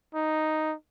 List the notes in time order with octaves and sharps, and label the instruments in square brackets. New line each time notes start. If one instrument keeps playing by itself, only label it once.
[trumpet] D#4